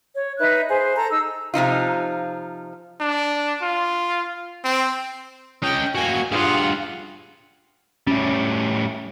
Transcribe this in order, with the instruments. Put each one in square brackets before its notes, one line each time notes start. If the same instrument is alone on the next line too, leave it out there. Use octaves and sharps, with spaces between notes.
[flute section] C#5
D#4 B4 E5 F#6
G#4 C5
A4 A#5
D#4 E6
[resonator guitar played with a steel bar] C3 F3 D#4 F4
[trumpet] D4
F4
C4
[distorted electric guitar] C#4 D#5 [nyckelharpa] G5
[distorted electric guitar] A#3 F#4 [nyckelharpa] G#5
[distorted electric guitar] G2 G#4 [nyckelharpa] F4 F#5
[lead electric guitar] A2 G3 [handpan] C#4